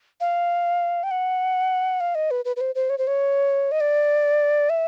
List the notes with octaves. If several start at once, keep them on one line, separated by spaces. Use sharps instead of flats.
F5
G5
F#5
F5
D#5
B4
B4
B4
C5
C5
C#5
C5
C#5
D#5
D5
E5